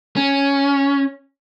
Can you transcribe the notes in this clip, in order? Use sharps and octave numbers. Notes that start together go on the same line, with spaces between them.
C#4